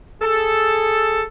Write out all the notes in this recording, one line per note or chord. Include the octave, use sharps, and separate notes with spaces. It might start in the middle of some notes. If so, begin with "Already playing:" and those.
G#4 A4